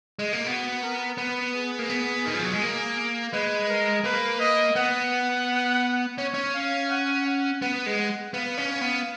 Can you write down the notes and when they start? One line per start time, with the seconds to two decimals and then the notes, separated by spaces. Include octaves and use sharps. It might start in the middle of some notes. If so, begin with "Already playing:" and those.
0.19 G#3
0.33 A#3
0.46 B3 F#4
0.82 A#4
1.18 B3 B4
1.54 G#4
1.79 A#3
1.89 B3
2.25 D#3
2.35 F3
2.43 F#3
2.53 G#3
2.62 A#3
3.33 G#3 B4
3.69 A#4
4.04 A#3 B4
4.40 D#5
4.76 B3 F#5
6.18 C#4 C#5
6.34 C#4
6.54 F5
6.90 F#5
7.26 F#5
7.62 B3 F#5
7.86 G#3
7.98 F#5
8.33 B3 F5
8.58 C#4
8.81 B3